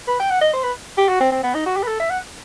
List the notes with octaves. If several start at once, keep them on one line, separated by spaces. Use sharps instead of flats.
B4
G5
F#5
D#5
C5
B4
G4
F#4
C4
C4
B3
D#4
F#4
G4
B4
A4
E5
F#5